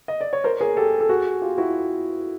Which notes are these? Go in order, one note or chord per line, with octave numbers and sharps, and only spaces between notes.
D#5
D5
C#5
A#4 C5
G#4 A#4
G4 A4
A4
F#4 G#4
F4 G4
E4 F#4